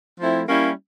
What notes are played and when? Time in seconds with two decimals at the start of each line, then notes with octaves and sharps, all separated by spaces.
0.19 F3 A3 C4 E4
0.48 G3 A#3 C#4 E4